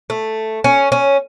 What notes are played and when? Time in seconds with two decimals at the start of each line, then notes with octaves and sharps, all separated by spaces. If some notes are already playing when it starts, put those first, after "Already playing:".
0.10 A3
0.64 C#4
0.92 C#4